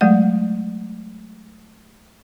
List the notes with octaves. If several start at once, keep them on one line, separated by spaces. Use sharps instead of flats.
F#3 G#3 A3 F#5